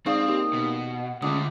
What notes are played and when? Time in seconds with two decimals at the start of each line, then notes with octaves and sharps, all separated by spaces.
0.06 G#2 C4 D5 F5 C#6 D#6
0.28 D#2 G4
0.53 B2
0.92 F#5
1.22 C#2 D3 A3 D6 D#6